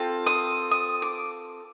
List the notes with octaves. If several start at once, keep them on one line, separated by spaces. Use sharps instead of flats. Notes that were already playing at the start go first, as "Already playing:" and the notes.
Already playing: C4 F4 A4
D#6
D#6
D6